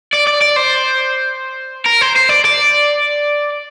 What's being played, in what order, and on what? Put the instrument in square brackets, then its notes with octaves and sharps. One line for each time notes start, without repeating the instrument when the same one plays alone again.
[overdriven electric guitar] D5
D5
D5
C5
A#4
C5
C5
D5
D5